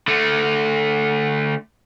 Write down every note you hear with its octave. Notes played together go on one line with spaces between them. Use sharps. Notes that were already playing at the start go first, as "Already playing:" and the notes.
D3 A3